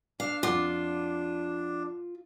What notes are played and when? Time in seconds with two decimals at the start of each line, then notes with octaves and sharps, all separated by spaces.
0.20 D4 F5
0.43 F2 F4 F#5 D6